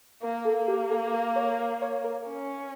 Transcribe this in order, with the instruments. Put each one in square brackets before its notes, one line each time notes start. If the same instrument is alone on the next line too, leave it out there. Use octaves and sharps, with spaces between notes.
[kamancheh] A#3 [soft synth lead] A#4
[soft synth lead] A4
[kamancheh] A#3
[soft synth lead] G4
A4
A#4
C#5
A#4
C#5
A#4
[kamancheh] C#4